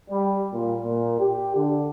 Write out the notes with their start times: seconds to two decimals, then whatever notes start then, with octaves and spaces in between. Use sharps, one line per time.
0.10 G3
0.54 A#2
0.83 A#2
1.20 G4
1.56 D3